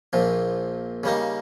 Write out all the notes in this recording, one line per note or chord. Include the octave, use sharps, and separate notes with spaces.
A#1 A#2 F3
C#3 G3 A#3 D#4